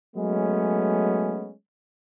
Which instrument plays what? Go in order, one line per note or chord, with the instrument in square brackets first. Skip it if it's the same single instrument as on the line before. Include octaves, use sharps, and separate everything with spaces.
[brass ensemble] F#3 G#3 A3 B3 C#4